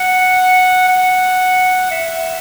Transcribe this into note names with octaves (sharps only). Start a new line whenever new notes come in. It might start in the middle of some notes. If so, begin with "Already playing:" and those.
Already playing: F#5
F#5
E5